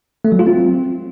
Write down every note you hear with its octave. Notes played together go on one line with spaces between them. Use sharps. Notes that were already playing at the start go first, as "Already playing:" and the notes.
A3
F#3
F4
C4